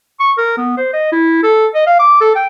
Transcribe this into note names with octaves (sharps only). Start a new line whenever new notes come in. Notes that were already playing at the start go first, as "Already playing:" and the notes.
C#6
A#4
B3
C5
D#5
E4
A4
D#5
F5
D6
A4
G5